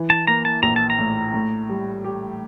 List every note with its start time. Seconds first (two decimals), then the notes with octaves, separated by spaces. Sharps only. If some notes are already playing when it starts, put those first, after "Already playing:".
Already playing: E3
0.10 A5
0.27 A#3 A#5
0.45 A5
0.63 A#1 A#5
0.76 A5
0.90 A#5
0.99 A2
1.34 A2
1.69 G3
2.04 G4